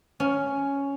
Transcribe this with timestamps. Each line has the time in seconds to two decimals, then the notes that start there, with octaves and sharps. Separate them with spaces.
0.20 C#4